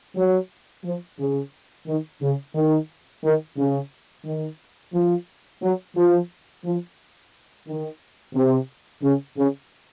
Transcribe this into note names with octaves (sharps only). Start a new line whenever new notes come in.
F#3
F3
C#3
D#3
C#3
D#3
D#3
C#3
D#3
F3
F#3
F3
F3
D#3
C3
C#3
C#3